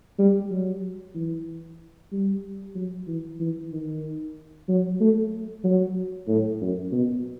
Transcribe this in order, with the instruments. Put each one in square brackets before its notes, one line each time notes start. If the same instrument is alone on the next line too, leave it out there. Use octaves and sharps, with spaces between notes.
[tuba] G3
F#3
E3
G3
F#3
E3
E3
D#3
F#3
A3
F#3
A2
F#2
B2